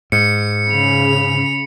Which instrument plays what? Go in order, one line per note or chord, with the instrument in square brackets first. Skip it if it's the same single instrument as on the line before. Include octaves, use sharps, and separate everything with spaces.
[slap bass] G#2 [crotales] C#7
[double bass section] C#3 [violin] B5 F7